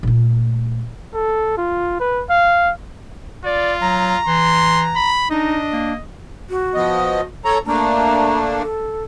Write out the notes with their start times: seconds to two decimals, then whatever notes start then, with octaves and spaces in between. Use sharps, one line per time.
0.03 A#2 A3
1.14 A4
1.57 F4
2.00 B4
2.29 F5
3.45 F4 D5
3.81 F#3 A#5
4.26 E3 C6
4.96 B5
5.30 D4 D#4 D#5
5.73 A#3
6.50 F#4
6.74 F3 B3 D#5
7.45 A4 C#5 A#5
7.67 A3 A#3 D4 A#5
8.61 A4